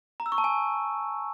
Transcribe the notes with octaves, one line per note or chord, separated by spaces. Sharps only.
A#5
E6
C#6
A5
G#5